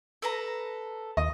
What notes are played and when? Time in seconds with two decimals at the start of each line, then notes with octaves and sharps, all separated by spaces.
0.22 A4 B4 A#5
1.17 D#2 D#5